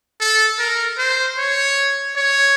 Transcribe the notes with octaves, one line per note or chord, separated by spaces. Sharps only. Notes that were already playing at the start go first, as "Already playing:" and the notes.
A4
A#4
C5
C#5
C#5